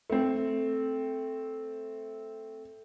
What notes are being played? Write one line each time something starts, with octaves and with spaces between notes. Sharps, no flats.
A3 C4